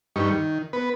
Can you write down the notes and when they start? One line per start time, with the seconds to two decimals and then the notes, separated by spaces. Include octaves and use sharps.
0.16 G2 G3 D#4 C#6
0.30 D#3
0.73 B3 B4